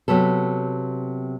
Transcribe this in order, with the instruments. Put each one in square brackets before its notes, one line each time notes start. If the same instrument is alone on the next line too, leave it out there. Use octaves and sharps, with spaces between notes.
[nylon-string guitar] C3 F#3 B3 A4